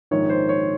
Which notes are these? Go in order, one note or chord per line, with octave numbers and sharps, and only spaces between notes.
A#1 G#2 D#3 C#5
C5
C#5